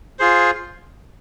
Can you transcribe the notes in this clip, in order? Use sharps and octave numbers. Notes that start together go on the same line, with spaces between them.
F4 G#4 C5